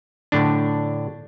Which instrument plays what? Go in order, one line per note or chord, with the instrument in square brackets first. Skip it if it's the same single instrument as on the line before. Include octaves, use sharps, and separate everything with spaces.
[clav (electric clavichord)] A2 D3 D4